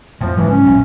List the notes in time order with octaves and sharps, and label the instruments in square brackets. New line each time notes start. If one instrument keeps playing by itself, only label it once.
[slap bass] F2 A2 [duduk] F3
[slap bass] G#2 C#3 F#3 [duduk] E3
[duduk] C#4
[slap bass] A#1 A2 F#3